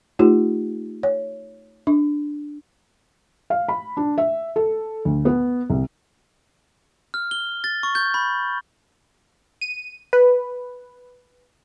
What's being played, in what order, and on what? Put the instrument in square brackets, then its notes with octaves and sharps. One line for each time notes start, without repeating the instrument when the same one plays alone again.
[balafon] A3 D#4 F4 G4
C#5
D4
[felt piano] F5
B5
D4
E5
A4
D2
B3
C2
[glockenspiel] F6
G7
A6
C#6
G6
B5
[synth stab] D#7
B4